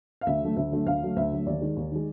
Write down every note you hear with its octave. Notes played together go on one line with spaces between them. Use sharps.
F5
D2 E5
D3 F#3 A3
D2 E5
D3 F#3 A3
D2 F5
D3 F#3 A3
D2 E5
D3 F#3 A3
D#2 D5
D#3 G#3
D#2
D#3 G#3